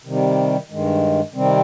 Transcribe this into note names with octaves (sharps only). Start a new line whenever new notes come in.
C3 D#3 G3
G2 D#3 G#3
C3 D#3 G3 C4